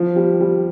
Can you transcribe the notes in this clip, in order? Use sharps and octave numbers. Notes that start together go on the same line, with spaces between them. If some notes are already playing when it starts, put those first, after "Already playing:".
Already playing: F3
G3
G3